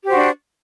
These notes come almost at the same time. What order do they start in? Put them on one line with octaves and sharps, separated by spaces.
G4 C5 F#4 D4